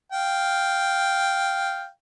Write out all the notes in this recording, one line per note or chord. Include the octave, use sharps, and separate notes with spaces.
F5 G5